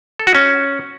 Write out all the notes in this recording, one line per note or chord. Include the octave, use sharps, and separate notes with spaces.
A4
F#4
C#4